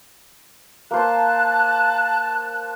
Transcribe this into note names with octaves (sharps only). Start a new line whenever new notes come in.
A#3 C5 A5 F#6